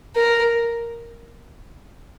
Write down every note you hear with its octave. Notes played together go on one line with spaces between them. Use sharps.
A#4